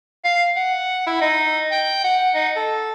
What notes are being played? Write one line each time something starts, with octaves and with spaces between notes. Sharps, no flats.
F5
F#5
E4
D#4
G5
F#5
D#4
A4